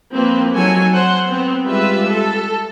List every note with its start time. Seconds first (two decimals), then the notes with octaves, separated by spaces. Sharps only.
0.15 F3 A#3 C4 B4
0.54 F#3 D#4 F#4 A4 C#5 G#5
0.94 C5 F#5 C6
1.27 B3 C4
1.65 G3 G#3 F4 G4 B4 E5
2.07 A4